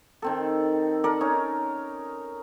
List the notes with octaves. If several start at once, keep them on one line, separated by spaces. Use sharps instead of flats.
D#3 C4 A4
A4 A#4 D5
C#4 D#4 A#4 C#5